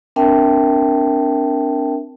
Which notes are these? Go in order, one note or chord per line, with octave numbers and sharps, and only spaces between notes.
C4 D4 A#4 E5 G5 A5